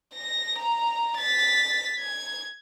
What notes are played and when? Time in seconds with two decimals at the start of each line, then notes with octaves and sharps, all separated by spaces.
0.15 A#6
0.59 A#5
1.18 A6 B6
1.98 G#6